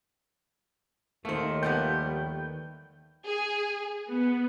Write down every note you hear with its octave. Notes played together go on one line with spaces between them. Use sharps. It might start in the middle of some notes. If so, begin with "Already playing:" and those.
D#2 D#3 A3 A#3 C5
F3 G3 B3 G5
G#4
B3